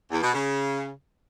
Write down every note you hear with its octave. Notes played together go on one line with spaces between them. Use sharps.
E2
B2
C#3